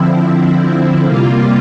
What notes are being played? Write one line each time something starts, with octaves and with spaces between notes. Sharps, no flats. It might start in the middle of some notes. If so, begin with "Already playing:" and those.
Already playing: D3 F3 C4 E4
C3 G3 A#3 F4